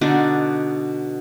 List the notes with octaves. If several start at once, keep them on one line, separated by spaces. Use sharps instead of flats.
B2 D3 D4 D#4